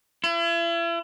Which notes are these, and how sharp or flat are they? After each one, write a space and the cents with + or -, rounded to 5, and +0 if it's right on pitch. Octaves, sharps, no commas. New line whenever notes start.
E4 +40